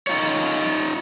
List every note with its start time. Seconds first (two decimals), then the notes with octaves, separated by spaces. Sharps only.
0.07 D#4 F4 C#5